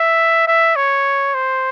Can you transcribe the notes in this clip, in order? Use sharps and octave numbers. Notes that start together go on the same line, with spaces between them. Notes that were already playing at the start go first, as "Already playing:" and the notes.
Already playing: E5
E5
C#5
C5